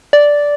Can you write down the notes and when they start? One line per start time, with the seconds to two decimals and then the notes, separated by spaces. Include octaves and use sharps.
0.13 D5